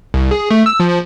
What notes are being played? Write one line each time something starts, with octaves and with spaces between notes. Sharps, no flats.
C2
G#4
A3
E6
F3